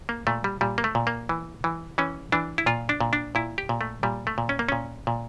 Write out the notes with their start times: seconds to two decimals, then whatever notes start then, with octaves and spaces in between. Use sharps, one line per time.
0.09 A#3
0.27 A#2 A3
0.44 G3
0.61 A#2 G3
0.78 A#3
0.84 A3
0.95 A#2
1.07 A#3
1.29 E3
1.64 E3
1.98 E3 C#4
2.32 E3 D4
2.58 E4
2.66 A#2 F4
2.89 D4
3.01 A#2
3.13 D4
3.35 A#2 E4
3.58 G4
3.69 A#2
3.81 A3
4.03 A#2 G3
4.27 A3
4.38 A#2
4.49 C#4
4.59 A#3
4.69 A#2 C#4
5.07 A#2